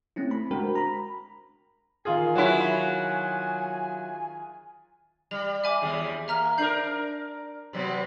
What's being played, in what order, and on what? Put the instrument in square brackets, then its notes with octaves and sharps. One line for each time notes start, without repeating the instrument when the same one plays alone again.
[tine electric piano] A3 C4 C#4 E4
B5
G#3 D4 F#4 A#4 C5 G5
A#5 B5
[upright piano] D#3 F4 G#4 [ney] G#5
[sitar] F#3 E4
[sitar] G3 [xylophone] F7
[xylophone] E5 G#5 D6
[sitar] D#2 G3 G#4
[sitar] A#3 [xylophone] E5 A#5 F6
[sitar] D4 E4 A#4 [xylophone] G6 C7 F#7
[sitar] C3 F#3 B3